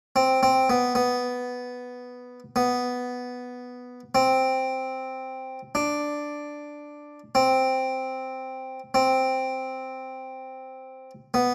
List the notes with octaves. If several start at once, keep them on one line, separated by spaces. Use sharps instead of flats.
C4
C4
B3
B3
B3
C4
D4
C4
C4
B3